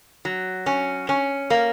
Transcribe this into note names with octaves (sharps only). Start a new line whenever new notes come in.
F#3
C#4
C#4
A#3